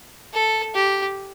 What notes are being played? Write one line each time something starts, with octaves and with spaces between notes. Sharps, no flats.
A4
G4